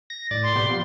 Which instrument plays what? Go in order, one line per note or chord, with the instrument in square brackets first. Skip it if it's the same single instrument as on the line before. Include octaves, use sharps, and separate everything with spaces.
[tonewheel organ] A#6
A2 D5 A6
[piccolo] C6
[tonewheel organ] B2 B3 G4
F3 B3